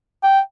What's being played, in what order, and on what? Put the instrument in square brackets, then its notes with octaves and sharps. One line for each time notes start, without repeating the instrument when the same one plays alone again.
[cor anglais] G5